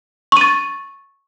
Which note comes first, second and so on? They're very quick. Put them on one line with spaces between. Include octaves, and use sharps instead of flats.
C#6 D#7 A6